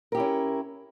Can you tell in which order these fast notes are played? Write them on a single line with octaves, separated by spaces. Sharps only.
A#4 G4 E4 C#4